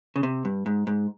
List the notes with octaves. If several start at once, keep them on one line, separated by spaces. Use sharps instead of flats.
C#3
C3
G2
G#2
G#2